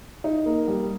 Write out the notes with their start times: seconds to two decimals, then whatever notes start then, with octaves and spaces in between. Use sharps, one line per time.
0.24 D#4
0.46 A#3
0.68 G3